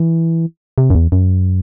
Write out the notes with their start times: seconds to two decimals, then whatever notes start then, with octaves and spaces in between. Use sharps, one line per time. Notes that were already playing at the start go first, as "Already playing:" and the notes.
Already playing: E3
0.78 C3
0.90 F#2
0.95 E2
1.12 F#2